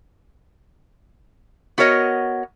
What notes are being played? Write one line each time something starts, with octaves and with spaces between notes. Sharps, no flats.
B3 F#4 A#4 C#5 D#5